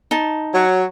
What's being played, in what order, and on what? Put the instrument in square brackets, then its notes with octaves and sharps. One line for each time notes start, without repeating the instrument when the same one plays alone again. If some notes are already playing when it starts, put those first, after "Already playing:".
[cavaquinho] D#4 A5
[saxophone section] F#3 C#5